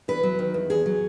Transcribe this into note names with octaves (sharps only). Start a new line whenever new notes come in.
E2 B4
F#3
D#3
E2
E2 G#4
F#3